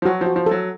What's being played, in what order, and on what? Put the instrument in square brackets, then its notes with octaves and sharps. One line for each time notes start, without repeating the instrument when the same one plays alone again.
[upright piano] F3
[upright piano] F#3 [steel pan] F#4
[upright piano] F3
[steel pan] F#4
[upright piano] F3
[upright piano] F#3 [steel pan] A4